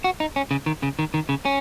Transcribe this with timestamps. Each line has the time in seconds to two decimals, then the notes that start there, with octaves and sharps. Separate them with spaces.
0.04 F#4
0.20 D#4
0.36 C#4
0.51 C#3
0.66 D#3
0.83 C#3
0.99 D#3
1.14 D#3
1.29 C#3
1.45 C#4